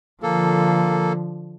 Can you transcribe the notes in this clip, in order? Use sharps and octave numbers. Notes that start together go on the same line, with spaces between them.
D3 F3 A#3 A4